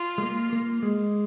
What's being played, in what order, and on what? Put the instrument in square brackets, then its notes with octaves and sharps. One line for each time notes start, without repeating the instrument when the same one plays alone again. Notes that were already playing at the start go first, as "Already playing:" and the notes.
Already playing: [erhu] F4
[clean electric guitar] G#3
A#3
A#3
G#3